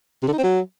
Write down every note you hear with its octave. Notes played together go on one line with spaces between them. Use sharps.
C3
D3
D#4
C4
F#3